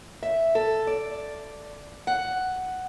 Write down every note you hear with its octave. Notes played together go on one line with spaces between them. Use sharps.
E5
A4
D5
F#5